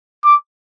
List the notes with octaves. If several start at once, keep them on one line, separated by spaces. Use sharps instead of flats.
D6